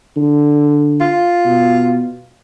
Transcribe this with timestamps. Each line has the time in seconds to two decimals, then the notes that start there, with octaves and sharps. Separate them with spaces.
0.17 D3
1.01 F4
1.45 B2